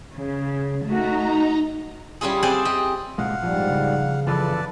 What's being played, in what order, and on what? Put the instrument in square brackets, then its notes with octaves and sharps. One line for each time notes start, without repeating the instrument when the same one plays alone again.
[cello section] C#3
[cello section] A3 F#4 [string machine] D#4 A#5
[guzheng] G3 C#4 E4 F4 G#4
C4 G#4 C5 D5 F#5 G#5
G4 D#5
[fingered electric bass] C2 A#2 G#3 [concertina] F5 F#5
[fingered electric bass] A#1 F3 [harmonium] G#2 G3
[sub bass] C#3
[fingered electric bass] F#1 E3 F3 [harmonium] A4 [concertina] B4 D5 A5